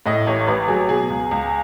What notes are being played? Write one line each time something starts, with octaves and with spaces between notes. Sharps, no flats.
A2 D#5
A1 C#5
A1 B4
F#3 G#4
B2 G#4
C#2
C#2